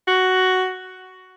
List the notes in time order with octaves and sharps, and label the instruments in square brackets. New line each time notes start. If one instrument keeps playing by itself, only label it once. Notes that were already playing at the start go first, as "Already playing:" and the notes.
[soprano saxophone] F#4